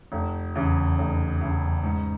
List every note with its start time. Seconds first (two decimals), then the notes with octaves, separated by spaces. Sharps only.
0.12 F1
0.55 E2 C#3
0.98 F1
1.41 E2 C#3
1.83 G#2